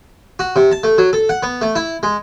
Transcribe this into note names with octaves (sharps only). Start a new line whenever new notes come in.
F#4
C3
A5
A3
F#3
A4
F#5
B3
A3
E4
G#3